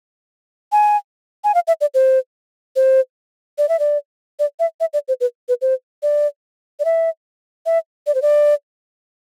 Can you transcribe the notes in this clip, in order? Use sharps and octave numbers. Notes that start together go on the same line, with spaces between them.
G#5
G#5
F5
E5
D5
C5
C5
D5
E5
D5
D5
E5
E5
D5
C5
B4
B4
C5
D5
D5
E5
E5
D5
C5
D5